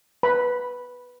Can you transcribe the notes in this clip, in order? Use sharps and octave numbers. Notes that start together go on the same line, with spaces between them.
B4 B5